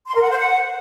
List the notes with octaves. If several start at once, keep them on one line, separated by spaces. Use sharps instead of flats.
C6
A#4
F#5
C5
F#5